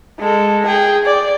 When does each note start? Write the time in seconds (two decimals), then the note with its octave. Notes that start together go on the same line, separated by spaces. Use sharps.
0.19 G#3 A4
0.66 G#4 G5
1.05 D5